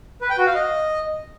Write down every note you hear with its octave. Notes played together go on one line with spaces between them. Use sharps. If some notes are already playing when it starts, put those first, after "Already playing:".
B4
G5
F#4
F5
D#5